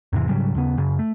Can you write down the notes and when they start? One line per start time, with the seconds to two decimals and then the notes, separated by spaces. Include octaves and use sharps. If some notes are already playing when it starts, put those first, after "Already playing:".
0.13 E2 G#2 C3 E3
0.29 G#2 C#3 F#3 G3
0.55 D#2 C#3 B3
0.78 F#2 C#3
0.99 A3